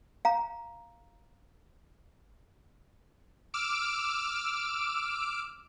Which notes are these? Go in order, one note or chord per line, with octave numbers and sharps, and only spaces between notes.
F5 A#5
D6 E6 F6 D7